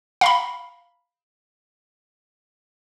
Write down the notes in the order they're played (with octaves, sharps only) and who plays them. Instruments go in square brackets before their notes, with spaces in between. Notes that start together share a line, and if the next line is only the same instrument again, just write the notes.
[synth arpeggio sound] F5 A#5 B5